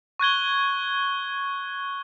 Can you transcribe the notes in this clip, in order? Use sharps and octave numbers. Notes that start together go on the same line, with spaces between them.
C#6 F#6 G#6 G7